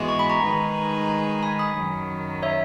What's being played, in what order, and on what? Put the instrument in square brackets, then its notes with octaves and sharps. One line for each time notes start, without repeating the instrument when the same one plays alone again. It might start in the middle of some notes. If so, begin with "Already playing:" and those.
Already playing: [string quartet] G#2 E3 G#3 B3 F#4
[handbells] C#6
B5
A#5 C#6
[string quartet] D#3 G#3 D#4 G#4 B4
[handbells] G#5 B5
B5 D#6
[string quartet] F#2 D#3 F#3
[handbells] C#5 E5